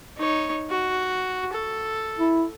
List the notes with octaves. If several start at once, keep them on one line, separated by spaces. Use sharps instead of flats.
D#4 C#5
F#4
A4
E4